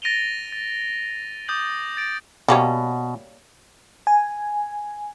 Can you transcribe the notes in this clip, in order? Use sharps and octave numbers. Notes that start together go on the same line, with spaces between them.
A6 A#6 D7 D#7 F7 G7
A6
D6 D#6 G6 A6 F#7
A6 D7
B2 G3 A#3 C#4
G#5